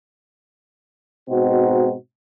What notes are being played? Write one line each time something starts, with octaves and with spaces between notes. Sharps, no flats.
G#2 B2 C4 D#4 F#4